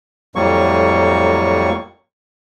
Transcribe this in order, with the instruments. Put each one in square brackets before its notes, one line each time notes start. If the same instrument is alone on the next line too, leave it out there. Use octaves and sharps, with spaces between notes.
[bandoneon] F2 A2 F#3 G3 A#3 C#6